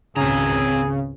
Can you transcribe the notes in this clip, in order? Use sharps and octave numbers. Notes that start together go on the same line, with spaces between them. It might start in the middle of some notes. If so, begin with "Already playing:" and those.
G#1 C#2 C#3 C4 G#4 A#5